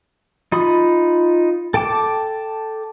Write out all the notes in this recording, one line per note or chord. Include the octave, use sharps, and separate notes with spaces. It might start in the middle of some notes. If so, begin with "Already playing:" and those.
D#4 F4 B5 D#6
A4 G5 A5 D6